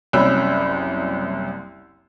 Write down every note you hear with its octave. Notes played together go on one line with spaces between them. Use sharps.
F#1 C2 F#2 C#4 B5 E6